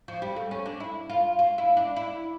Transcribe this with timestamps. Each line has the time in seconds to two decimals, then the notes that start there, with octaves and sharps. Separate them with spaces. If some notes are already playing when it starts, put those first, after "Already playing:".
0.08 F3
0.22 G3
0.36 A3
0.51 C#4
0.66 D4
0.80 E4
1.10 F4
1.39 F4
1.58 E4
1.77 D4
1.96 E4